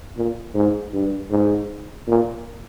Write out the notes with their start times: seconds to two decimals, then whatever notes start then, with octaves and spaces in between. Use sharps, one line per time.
0.17 A#2
0.54 G#2
0.93 G2
1.30 G#2
2.07 A#2